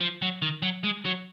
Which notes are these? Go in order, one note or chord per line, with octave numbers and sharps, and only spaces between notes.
F3
F#3
D#3
F#3
G#3
F#3